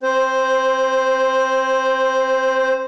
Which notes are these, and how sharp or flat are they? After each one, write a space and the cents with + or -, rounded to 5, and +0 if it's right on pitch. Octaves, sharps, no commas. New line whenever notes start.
C4 +20 C5 +0